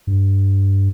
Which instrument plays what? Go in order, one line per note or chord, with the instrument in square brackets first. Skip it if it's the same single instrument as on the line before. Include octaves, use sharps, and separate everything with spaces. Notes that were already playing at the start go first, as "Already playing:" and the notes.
[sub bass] G2